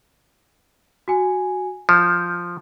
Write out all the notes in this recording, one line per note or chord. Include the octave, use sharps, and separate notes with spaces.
F#4 G#5
F3 F6 G6